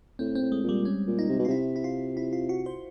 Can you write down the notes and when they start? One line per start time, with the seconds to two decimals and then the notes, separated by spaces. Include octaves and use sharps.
0.19 A2 C4
0.35 C4
0.41 A2
0.52 G#3
0.63 A#2
0.69 G3
0.85 C#4
1.07 A#2
1.19 D#4
1.29 C3
1.39 B2
1.45 F4
1.48 C3 E4
1.76 E4
1.84 F4
2.17 E4
2.33 F4
2.49 F#4
2.66 C5